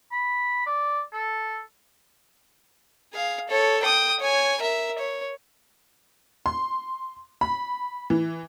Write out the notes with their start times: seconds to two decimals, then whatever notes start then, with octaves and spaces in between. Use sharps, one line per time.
0.12 B5
0.67 D5
1.13 A4
3.13 G#4 F5
3.48 A4 C#5
3.82 G5 D#6
4.20 C#5 G#5
4.60 A#4 E5
4.98 C#5
6.46 C6
7.41 B5
8.10 E3